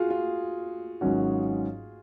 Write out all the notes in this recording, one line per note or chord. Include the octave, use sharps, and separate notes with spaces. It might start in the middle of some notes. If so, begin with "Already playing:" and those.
Already playing: F4 F#4 G#4
F4
G#1 G#2 F#3 C#4 F#4